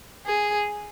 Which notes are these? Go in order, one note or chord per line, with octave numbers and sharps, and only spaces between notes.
G#4